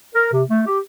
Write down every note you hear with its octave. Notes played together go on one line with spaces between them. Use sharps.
A#4
C3
A3
G4